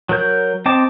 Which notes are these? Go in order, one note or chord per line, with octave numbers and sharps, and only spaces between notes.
F#3 A#4 G6
C4 D#5 G5 A5 D6